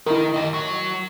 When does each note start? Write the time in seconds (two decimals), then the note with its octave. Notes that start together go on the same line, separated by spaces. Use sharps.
0.06 D#3 E4 A#4
0.34 G4 D#5
0.54 F#3